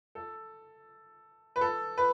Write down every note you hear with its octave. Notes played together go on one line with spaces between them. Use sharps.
A4
B4
A4
B4